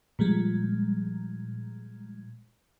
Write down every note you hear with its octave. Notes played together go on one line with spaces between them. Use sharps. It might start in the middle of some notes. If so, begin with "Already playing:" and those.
A#2 F3 G3 G#3